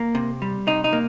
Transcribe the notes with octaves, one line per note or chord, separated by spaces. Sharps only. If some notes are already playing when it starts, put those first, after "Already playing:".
Already playing: A#3
C3
G3
C3 D#4
D#4
A#3